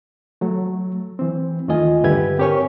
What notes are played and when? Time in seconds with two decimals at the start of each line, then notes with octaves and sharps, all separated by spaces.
0.41 F#3 A3
1.19 E3 C4
1.68 D#2 D#3 A3 F4 D#5 G#5
2.04 G2 D3 G4 B4 E5 G#6
2.39 C4 G4 A#4 C#5 G#5 C#6